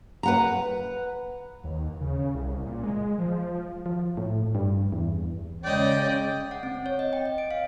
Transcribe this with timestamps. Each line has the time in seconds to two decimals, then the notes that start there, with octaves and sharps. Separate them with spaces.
0.23 B4 F#5 A#5
1.64 D#2
2.01 C#3
2.18 C#3
2.34 C2
2.66 A#2
2.83 G#3
3.18 F3
3.86 F3
4.17 A2
4.55 G2
4.92 E2
5.64 C#3 G#3 C#4 D5 D#5 G5
6.51 F#5
6.63 C4
6.86 C#5
6.99 D#5
7.13 G5
7.26 D#5
7.38 D7
7.51 F5